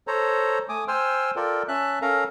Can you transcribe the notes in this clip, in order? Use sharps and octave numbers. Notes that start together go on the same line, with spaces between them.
A4 C5 C#5 A#5
A3 G#5 D6 D#6
C5 G5 G#5 C6 E6 F6
F4 A4 A#4 D5 G5
C#4 E5 A5 F#6
C#4 A4 A#4 F5 A#5